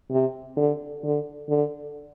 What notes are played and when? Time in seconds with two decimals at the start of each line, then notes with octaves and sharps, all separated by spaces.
0.10 C3
0.57 D3
1.03 D3
1.49 D3